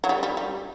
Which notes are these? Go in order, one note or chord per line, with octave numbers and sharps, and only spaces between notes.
F#3
G3
G3
G3